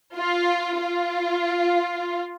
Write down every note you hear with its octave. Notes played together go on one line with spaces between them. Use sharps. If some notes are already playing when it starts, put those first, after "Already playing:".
F4
F4